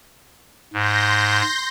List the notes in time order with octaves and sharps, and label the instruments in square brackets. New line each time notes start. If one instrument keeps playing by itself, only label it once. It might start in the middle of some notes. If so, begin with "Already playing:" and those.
[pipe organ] G#2 [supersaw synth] C6 G6 A#6